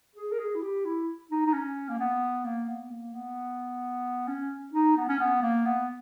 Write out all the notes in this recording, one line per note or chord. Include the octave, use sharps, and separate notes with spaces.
G#4
A#4
G#4
E4
G4
E4
D#4
D#4
C#4
A#3
B3
A#3
B3
A#3
B3
C#4
D#4
B3
C#4
B3
A#3
B3